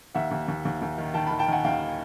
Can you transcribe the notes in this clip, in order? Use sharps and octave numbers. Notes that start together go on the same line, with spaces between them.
D#2 E5 F#5
D#2
D#2
D#2
D#2
D#3
D#3 G5 A5
D#3 A5 B5
G5 A5
D#3 F#5 G#5
D#2 F5 G5